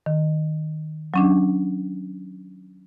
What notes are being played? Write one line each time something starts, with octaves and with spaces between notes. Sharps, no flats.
D#3
F#3 C#4 D4